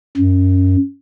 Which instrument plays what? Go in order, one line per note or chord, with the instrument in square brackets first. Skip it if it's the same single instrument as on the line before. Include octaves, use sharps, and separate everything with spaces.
[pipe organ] F#2